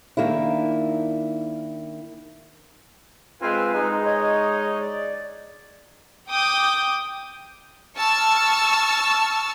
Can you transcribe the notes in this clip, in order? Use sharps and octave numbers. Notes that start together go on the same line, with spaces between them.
D#3 A#3 D4 E4
G#3 C4 F4 B4 G#5
G#3 D#4
C#5 D#5
D5
G5 D6 D#6 G6
A5 C#6 E6 F6